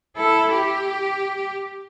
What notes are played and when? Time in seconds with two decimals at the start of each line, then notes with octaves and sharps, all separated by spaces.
0.16 E4 A4
0.52 G4